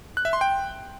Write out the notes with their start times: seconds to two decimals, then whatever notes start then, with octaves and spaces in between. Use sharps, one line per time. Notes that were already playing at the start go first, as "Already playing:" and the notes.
0.17 F#6
0.25 E5
0.33 C6
0.41 G5